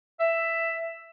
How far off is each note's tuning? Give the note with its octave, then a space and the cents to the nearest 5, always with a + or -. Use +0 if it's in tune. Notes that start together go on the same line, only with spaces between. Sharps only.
E5 +10